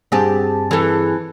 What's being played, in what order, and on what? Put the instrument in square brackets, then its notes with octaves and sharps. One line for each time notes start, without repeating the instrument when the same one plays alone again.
[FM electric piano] G2 G#4 A5 [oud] C4 G4
[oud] E3 A4